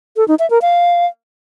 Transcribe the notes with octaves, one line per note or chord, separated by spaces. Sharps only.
A4
D#4
E5
A#4
F5